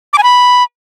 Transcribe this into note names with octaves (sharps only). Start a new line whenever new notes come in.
D6
G#5
B5